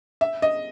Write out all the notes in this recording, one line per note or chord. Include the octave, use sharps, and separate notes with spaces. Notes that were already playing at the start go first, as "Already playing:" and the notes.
E5
D#5